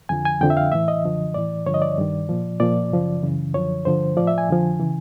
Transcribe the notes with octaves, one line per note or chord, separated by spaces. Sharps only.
F2 D3 F3 G#5
G#5
F2 D3 F3 G5
E5
F5
A2 E3 E5
D#5
F#2 D3 F3
A2 E3 D5
G2 D3 F3 C#5
D#5
D5
G2 D#3
A#2 F3
A#2 F3 D5
F#2 C#3 F3
F#2 C#3 E3
F#2 D3 F3 C#5
G2 D3 F3 C5
A2 F3 D5
E5
G#5
F2 D3 F3
C#3 E3